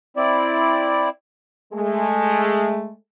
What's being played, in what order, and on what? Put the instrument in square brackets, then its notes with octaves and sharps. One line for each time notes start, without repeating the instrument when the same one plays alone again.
[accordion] C4 E4 D5
[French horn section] G#3 A3